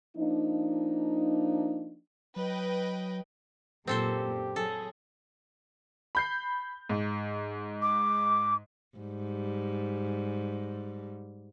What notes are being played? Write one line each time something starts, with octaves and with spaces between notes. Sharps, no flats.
F3 A#3 D4 D#4
F#3 B4 D#5 G5
F#2 A#2 C4 G4 A4 C5
F#3 G#4 A4
B5 G6 C7
G#2
D6
G#2 G3